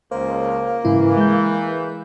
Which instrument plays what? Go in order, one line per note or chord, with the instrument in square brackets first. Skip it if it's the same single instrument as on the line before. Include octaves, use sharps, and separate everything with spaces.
[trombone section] C#2 [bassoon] A#3 [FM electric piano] C5
[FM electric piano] G#2 C#3 E4 [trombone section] E3
[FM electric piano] G#3 G6